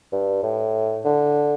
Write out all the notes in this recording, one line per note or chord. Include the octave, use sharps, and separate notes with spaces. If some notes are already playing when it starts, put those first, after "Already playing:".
G2
A2
D3